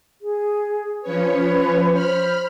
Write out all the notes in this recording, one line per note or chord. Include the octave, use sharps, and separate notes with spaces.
G#4
F3 C#4 B4 C#5
C5 B5 F6